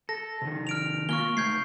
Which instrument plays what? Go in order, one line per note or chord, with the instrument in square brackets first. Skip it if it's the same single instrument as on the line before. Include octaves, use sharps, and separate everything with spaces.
[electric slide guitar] A4 [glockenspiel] A#6
[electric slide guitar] C3 D#3
[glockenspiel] F6 D7 F7
[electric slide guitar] A#3 F4 G#5 [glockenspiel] C#6 F6 G7
[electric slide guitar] C3 A3 [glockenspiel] G6 G#6 C7